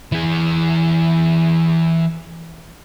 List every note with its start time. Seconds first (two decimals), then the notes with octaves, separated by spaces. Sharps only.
0.12 E3 G#4